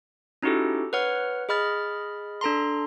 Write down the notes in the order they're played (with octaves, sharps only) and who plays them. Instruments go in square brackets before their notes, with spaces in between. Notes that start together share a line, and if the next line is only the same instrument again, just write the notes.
[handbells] C#4 D#4 E4 F#4 G4 A4
B4 C#5 F#5 F6
G#4 D#5 B5 F6 A6
D4 A4 A#5 C6